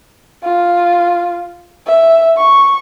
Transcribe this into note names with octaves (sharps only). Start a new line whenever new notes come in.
F4
E5
C#6